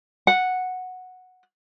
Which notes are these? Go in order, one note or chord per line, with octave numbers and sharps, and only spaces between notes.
F#5